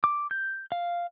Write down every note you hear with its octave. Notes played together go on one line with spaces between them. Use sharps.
D6
G6
F5